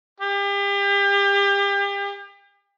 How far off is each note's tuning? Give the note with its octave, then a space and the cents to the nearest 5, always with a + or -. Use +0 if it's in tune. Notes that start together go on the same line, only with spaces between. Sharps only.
G4 +35